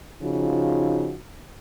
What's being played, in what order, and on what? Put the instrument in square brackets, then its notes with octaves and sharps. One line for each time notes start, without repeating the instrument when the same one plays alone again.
[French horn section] C#3 F3 D#4 F4 F#4